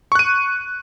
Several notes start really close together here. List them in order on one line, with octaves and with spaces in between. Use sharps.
C#6 F#6 D#7